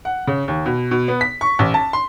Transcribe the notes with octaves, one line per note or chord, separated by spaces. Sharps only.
F#5
C#3
D#2
B2
B2
B3
B6
C#6
A1
A5
C6